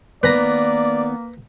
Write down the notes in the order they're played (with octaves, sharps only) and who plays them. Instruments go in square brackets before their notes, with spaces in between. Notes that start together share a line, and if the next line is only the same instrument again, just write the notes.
[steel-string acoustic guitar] D#3 B3 [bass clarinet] A#3 [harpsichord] B4 A#5 [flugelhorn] D5